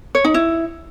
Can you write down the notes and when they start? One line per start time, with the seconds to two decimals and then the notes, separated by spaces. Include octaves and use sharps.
0.15 C#5
0.25 D#4
0.34 E4